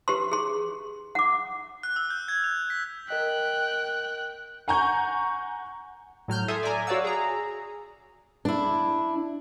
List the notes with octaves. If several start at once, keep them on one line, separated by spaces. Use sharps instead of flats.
G4 B4 C6
G#4 C6
F#5 D6
F#6
E6
G6
G#6
F7
B6
A#4 D#5 G5 F#6 B6
F#5 G#5 A#5 C#6 G6
A2 F#3 F6 G6
A4 E5 G#5 C6 D#6
D5 E5 G#5 A#5
F#4 C#5 D5 F5 F#5 E6
G#4 A#5
D4 E4